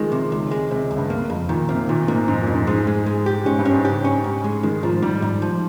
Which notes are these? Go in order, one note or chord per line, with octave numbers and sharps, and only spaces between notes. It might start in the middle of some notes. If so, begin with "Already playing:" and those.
Already playing: D#3 F3 G#3
C3
C#2
G#3
C#2 C3
C#2
G2
A#3
F2
A#2 D#3
C3 A#3
A#2 D#3
G#2 A#3
F2 G#2
A#2
F2
G#2
G#2 G#3
G#3
G#3
G4
G#2 C#4
G2
C#4
G#2
C#3 G4
C#4
G#2
G#3
D#3 G#3
G#2 F3
G#2 G3
G#2
F3